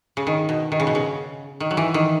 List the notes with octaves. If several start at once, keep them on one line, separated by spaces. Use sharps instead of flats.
C#3
D#3
B2
D#3
C#3
B2
C#3
D#3
F#3
E3
D#3